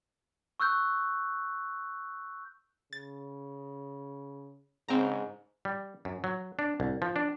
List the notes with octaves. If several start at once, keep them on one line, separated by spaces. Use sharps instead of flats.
C#6 E6 F#6 G6
C#3 A6
G#2 C#3 C4 A#5
G3
F#2
F#3
D4
C2
F3
D4